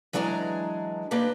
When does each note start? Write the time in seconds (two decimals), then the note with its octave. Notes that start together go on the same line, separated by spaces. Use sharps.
0.13 E3 F#3 G#3 D4 G#4 A#5
1.11 A#3 D4 D#4 G4 B4